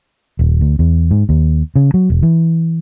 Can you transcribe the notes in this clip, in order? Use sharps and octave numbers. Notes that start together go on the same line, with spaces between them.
D#1
D2
E2
G#2
D#2
C#3
F#3
E1
E3